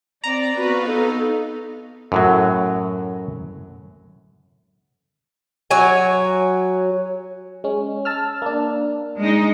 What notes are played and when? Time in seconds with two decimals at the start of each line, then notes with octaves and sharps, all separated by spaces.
0.24 C4 D5 A#5
0.57 B3 F#4 B4 F5
0.86 D#4 A4
2.12 F#2 A2 F#3
5.71 F#3 C#5 G#5
7.64 G#3 C#4
8.05 A5 E6 F6
8.42 A#3 D4
9.18 G#3 D#4